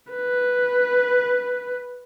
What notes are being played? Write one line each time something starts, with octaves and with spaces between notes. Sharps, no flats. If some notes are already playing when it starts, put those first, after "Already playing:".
B4